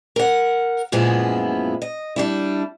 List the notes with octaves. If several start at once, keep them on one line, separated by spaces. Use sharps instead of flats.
A#4 F#5
F#2 A#2 F3 G#3 B3 E4
D#5
G3 D4 E4